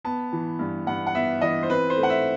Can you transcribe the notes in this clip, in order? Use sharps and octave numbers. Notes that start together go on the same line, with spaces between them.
B3 A5
E3
G2
G2 F#5
F#5
B3 E5
E3 D#5
C5
C4 B4
C5
A3
F#5
E5